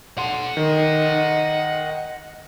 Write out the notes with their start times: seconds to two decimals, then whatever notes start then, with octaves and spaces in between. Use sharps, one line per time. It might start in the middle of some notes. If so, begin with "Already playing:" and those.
0.18 F#5 C6
0.57 D#3 D#5